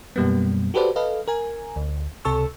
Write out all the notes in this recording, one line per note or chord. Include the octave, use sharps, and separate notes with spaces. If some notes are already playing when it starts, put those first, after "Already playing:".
F#2 B2 G3 A#3 B3
F#4 G4 A4 B4 C5 D5
A4 B4 D#5 F5
A#4 G#5
D2
C#2 C3 A4 A5 C#6 E6